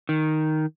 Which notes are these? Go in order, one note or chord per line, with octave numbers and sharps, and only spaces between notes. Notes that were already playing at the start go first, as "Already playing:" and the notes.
D#3